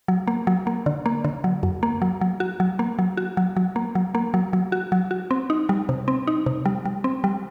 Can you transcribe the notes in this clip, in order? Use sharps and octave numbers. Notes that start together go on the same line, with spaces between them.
F#3
A#3
F#3
A#3
D3
A#3
D3
F#3
F#2
A#3
F#3
F#3
F#4
F#3
A#3
F#3
F#4
F#3
F#3
A#3
F#3
A#3
F#3
F#3
F#4
F#3
F#4
C4
D#4
G3
C3
C4
D#4
C3
G3
G3
C4
G3